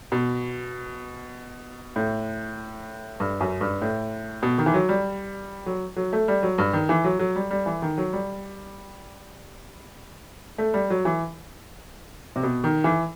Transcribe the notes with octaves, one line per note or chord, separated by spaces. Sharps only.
B2
A2
G2
F#2
G2
A2
B2
D#3
E3
F#3
G3
F#3
F#3
A3
G3
F#3
G2
D#3
E3
F#3
F#3
G3
G3
E3
D#3
F#3
G3
A3
G3
F#3
E3
C3
B2
D#3
E3